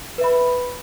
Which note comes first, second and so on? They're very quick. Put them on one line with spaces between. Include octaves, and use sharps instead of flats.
B4 E5 B5